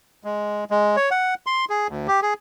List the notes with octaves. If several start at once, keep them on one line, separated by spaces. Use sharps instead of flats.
G#3
G#3
C#5
F#5
C6
G#4
D2
G4
G#4